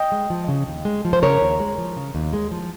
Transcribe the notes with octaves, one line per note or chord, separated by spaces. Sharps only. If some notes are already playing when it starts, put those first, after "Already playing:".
Already playing: D#5 G5
G#3
F3
C#3
D#2
G#3
F3
C5
C#3 A#4 C#5
D#2
G#3
F3
C#3
D#2
G#3
F3